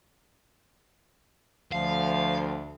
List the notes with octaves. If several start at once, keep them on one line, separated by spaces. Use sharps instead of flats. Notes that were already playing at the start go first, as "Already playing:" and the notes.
D2 F3 F5